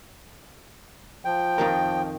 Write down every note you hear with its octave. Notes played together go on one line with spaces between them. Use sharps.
F3 G5
F2 D#3 A#4